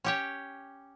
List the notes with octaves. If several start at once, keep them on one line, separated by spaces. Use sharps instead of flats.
C#4 G4 C#5